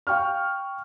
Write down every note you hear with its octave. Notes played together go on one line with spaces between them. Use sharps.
F5 G5 C#6 F6